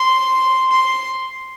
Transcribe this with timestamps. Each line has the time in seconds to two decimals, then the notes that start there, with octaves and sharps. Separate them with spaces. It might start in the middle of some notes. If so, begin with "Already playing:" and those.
Already playing: C6
0.72 C6